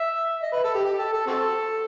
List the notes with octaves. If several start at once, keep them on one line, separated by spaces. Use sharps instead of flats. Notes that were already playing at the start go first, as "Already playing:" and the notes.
Already playing: E5
D#5
B4
A4
G4
G4
A4
A4
C4 F#4 A4